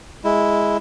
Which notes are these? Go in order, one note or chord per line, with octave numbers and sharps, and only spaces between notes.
G#3 E4